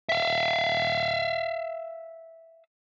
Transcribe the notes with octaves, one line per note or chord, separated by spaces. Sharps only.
E5 F5